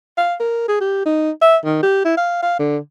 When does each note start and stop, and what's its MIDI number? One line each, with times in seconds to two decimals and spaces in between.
0.18 0.35 77
0.40 0.68 70
0.68 0.79 68
0.81 1.04 67
1.06 1.31 63
1.42 1.57 76
1.65 1.81 51
1.83 2.05 67
2.05 2.15 64
2.17 2.42 77
2.42 2.59 77
2.60 2.77 50